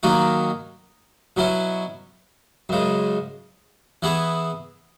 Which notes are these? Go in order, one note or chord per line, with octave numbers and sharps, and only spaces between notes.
D#3 F#3 A#3 D#4 F#4
B2 F#3 C#4 E4
F#2 C#3 G#3
E3 B3 E4 G#4